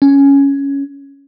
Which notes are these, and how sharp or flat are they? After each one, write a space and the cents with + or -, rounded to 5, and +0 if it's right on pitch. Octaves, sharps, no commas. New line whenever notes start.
C#4 +5